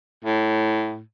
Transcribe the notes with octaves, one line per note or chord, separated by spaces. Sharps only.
A2